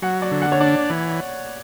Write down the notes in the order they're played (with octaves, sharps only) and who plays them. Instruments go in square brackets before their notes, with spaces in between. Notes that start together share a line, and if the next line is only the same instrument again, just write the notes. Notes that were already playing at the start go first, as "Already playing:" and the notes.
[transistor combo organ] F#3 [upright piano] F#5
[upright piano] D5
[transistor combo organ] D3
[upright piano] F#5
C#5
[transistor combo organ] D4 [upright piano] D5
[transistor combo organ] E3